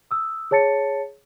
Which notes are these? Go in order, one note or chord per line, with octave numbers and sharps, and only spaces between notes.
D#6 E6
G#4 C#5 A5 A6 C#7